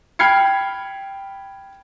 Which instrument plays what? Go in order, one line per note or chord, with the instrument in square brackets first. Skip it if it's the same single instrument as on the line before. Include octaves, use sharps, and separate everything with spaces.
[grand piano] G5 B5 F6 G#6 C7 C#7